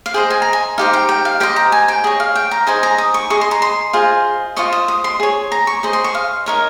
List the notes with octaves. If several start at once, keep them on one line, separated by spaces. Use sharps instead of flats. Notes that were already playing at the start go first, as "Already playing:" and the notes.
F5
G#4 C5 D#5 G5
G#5
A#5
G#5
D#4 G4 C5 F5
G5
G5
F5
G4 C5 D#5 G5
A#5
G#5
G5
G#4 C#5 D#5
F5
G5
A#5
D#4 G#4 C5 D#5 G#5
A#5
D#6
C#6
G#4 D#5 C#6
C6
A#5
C6
F4 G#4 C5 D#5
F4 C5 D#5 C#6
D#6
D#6
C6
G#4 C#5
A#5
C#6
G#4 C5 D#5
C6
C#6
F5
D#4 A#4 C#5